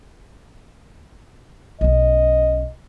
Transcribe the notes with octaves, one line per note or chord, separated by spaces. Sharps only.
B1 C#4 D#5